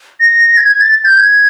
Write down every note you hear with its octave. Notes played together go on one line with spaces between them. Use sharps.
A#6
G#6
G#6
A6
A6
G6
G#6